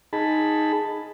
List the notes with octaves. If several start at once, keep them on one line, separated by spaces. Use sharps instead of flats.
D#4 G#4 A5 B5